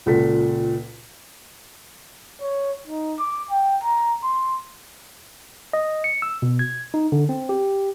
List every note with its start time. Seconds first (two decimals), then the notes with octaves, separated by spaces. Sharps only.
0.06 C#2 A#2 F#4 A4 B6
2.41 C#5
2.87 D#4
3.19 D6
3.50 G5
3.83 A#5
4.23 C6
5.73 D#5
6.04 C#7
6.22 E6
6.42 B2
6.59 G#6
6.94 D#4
7.12 D3
7.29 C4
7.49 G4